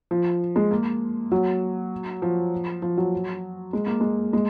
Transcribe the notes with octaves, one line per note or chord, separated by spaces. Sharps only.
F3
G#3
A#3
F#3
F3
F3
F#3
G#3
A#3
G#3
G#3